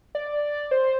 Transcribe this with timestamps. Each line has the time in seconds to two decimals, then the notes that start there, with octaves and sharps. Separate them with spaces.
0.15 D5
0.71 C5